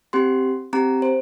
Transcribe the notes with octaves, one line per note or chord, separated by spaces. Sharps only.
C4 G4 C6
C4 G4 A#5
C5